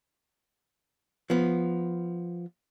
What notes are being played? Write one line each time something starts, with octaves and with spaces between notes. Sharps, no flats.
F3 B3